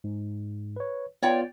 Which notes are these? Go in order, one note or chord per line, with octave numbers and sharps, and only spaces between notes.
G#2
B4 C#5
B3 F4 C#5 D5 G5